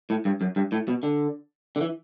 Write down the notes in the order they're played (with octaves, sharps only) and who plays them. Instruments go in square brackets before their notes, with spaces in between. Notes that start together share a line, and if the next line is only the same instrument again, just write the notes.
[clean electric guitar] A2
G2
F#2
G2
A2
B2
D3
D3
E3